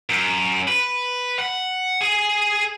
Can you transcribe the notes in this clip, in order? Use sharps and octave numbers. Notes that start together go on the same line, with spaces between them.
F#2
B4
F#5
G#4